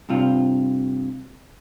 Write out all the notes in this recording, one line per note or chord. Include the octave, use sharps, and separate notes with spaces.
G2 C3 F4